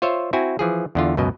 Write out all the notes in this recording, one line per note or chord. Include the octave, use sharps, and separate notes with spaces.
F4 C5 C#5 E5
C4 E4 F#4 G#5
E3 F3 G#4
E2 D3 F4
C#2 F#2 B2 D#5